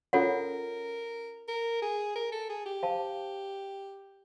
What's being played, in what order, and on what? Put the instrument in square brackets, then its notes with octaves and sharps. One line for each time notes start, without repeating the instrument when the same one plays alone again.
[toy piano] C#4 F4 A4 C#5 F#5 [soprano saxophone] A#4
[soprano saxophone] A#4
G#4
A#4
A4
G#4
G4
[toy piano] C5 F5 A5